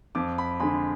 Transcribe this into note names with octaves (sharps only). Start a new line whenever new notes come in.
F2 D6
B5
D3 G#3 B5